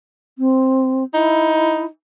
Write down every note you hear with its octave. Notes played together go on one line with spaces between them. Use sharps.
C4
D#4 E4